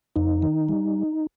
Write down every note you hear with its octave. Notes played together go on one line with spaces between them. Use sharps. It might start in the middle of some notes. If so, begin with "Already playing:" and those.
F2 D#4
D#3
G3